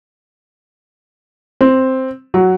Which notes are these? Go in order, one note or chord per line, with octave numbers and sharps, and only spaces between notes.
C4
F#3